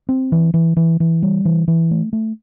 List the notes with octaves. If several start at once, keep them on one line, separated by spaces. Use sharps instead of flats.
C4
E3
E3
E3
E3
G3
E3
E3
A3
A3